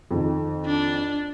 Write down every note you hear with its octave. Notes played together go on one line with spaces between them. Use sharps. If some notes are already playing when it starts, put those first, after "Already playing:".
F2 D#3
D4